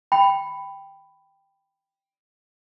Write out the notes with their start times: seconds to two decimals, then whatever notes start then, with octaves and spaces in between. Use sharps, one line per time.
0.12 G5 B5